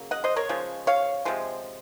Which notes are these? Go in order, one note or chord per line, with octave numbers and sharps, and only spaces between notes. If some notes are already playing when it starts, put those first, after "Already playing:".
Already playing: C#3 F#3 A#3
D#5 F#5
C5 D#5
A#4 C#5
C#3 F3 G#3
C#5 F5
C3 F3 G#3